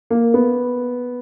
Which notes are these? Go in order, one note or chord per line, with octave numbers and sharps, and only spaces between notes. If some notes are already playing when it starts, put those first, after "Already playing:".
A#3
B3